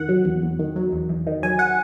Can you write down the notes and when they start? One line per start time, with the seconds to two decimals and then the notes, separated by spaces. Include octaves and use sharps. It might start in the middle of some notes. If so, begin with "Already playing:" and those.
Already playing: E2 D#3 F#5
0.09 F#3
0.25 E2
0.43 E2
0.59 D#3
0.76 F#3
0.92 E2
1.09 E2
1.27 D#3
1.43 F#3 G#5
1.59 F#5